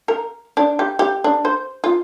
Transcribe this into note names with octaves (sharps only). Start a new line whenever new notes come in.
A#4
D4
G4
G4
D4
C5
F4